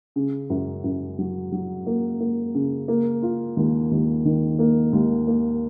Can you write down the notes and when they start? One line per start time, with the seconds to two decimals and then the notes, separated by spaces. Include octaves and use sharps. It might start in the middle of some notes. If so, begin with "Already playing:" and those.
0.16 C#3
0.50 F#2
0.84 F#2
1.19 F#3
1.52 F#3
1.87 A#3
2.20 A#3
2.54 C#3
2.88 A#3
3.22 F4
3.57 D#2
3.91 D#2
4.25 D#3
4.59 A#3
4.93 D#2
5.27 A#3